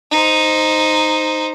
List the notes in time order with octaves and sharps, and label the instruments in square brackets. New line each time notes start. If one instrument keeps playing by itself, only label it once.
[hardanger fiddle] D#4 C5